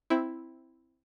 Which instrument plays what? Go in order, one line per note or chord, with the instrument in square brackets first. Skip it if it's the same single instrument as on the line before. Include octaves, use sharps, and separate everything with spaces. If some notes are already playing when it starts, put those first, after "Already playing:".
[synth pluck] C4 E4